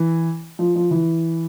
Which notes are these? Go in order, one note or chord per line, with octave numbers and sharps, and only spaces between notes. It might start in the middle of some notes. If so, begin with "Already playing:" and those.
Already playing: E3
F3
F3
E3